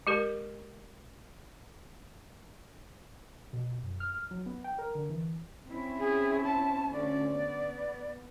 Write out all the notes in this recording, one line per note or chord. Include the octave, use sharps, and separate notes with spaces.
G#3 G4 A#4
B2
F#2
F6
F#3
B3
G5
A#4
D3
E3
C4 C#4 E4
G#4
A5
D2 C#4 D5
B3